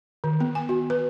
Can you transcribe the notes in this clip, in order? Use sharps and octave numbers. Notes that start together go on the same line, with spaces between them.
D#3
B3
G#5
F#4
B4